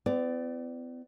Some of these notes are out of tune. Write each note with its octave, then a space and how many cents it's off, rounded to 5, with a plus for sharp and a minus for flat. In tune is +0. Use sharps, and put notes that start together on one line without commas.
B3 +45 E4 +45 D5 +0